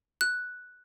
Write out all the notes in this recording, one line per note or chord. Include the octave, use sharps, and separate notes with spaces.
F#6